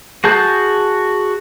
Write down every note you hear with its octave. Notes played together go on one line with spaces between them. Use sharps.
F#4 G#4 A5 G6